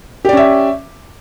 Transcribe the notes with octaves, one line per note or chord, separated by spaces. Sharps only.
C#4 G4 D5 E5